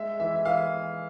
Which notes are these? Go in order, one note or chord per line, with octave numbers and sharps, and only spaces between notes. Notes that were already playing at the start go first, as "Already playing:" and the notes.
Already playing: G#3 E5
E3 E5
E5
E3 F5